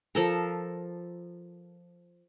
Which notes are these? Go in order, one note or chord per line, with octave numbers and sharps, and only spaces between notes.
F3 A4 A#4